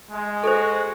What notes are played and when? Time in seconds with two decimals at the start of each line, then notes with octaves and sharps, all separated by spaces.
0.11 G#3
0.44 F#4 A4 C5